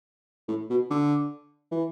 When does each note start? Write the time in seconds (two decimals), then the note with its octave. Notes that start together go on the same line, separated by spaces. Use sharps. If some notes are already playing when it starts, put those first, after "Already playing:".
0.48 A2
0.70 B2
0.90 D3
1.71 E3